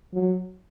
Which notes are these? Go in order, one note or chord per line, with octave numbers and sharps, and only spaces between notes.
F#3